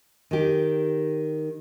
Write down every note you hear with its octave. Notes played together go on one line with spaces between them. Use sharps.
D#3 G4